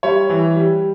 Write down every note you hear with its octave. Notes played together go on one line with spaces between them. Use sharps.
G3 C#5
E3
G3